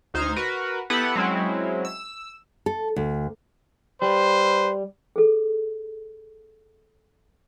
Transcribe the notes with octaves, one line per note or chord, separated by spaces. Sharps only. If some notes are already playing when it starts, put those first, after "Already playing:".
D2 D#4 C5 F6 G#6
F#4 A#4 B4
B3 E4 G4 A4 B4 F#5
F#3 G#3 C4 C#4 E4
E6
A4
D2
G3 B4 C5
G#4 A4